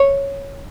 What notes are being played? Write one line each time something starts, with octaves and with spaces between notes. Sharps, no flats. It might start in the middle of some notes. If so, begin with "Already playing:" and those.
Already playing: C#5